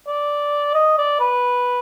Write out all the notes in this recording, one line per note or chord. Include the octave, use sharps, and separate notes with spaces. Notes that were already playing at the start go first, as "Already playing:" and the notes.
D5
D#5
D5
B4